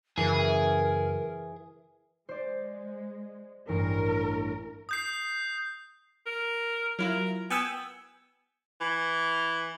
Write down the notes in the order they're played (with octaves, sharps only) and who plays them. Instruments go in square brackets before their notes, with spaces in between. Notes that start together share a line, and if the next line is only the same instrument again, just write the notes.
[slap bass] F#2 C#3 [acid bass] E3 [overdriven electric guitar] G#4 [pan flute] A#4
[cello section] G#3 [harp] C5 D5
[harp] A1 G2 [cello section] A#4
[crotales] D#6 G6 C7
[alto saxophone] A#4
[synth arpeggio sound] F#3 E4 F4 [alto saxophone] A#4
[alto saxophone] B3 [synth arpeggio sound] G5 G#5 E6
[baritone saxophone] E3